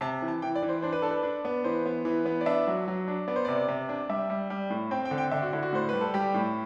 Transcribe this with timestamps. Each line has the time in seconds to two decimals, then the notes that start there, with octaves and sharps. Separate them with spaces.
0.01 C3 A5
0.22 E3
0.28 A5
0.42 E3 G5
0.55 D5
0.63 E3
0.69 C5
0.82 D4 C5
0.93 B4
1.02 D4 A4
1.11 B4
1.23 D4
1.45 B3
1.64 E3 C5
1.86 B3
2.05 E3
2.25 B3
2.41 D5
2.46 D4 E5
2.67 F#3
2.88 F#3
3.08 D4
3.28 B3 D5
3.36 C5
3.45 C3 D5
3.68 C3
3.89 D4
4.09 G3 E5
4.30 G3
4.50 G3
4.70 A2
4.91 C4 G5
5.05 G5
5.11 D3
5.18 G5
5.31 D3 E5
5.42 F#4
5.53 D3 E4
5.63 F#4
5.73 A2 C5
5.89 G3 B4
6.01 A4
6.14 G3 G4
6.34 A2